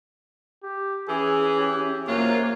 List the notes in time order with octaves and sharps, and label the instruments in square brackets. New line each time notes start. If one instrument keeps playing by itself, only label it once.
[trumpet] G4
[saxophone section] E3 [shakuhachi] C#4 [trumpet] G#4
[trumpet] G4
[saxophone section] F#2 C3 F4 [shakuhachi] A#3 [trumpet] C#5